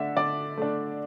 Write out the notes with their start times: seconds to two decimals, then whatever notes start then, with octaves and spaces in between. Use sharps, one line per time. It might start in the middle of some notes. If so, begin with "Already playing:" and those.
Already playing: D3 A3 D4 E5
0.17 D3 D5
0.57 A3 D4